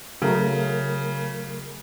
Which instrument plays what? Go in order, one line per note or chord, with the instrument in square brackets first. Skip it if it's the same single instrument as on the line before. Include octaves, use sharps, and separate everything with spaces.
[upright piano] C#3 [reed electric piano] F#3 A3 A#4